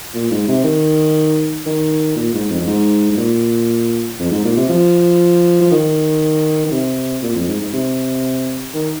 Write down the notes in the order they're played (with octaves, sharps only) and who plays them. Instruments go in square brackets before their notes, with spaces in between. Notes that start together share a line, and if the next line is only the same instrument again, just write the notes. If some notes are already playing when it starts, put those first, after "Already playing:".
[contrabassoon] A#2
G#2
C3
D#3
D#3
A#2
G#2
F2
F2
G#2
G#2
A#2
F2
G#2
A#2
C3
F3
F3
D#3
D#3
C3
A#2
F2
G#2
G#2
C3
D#3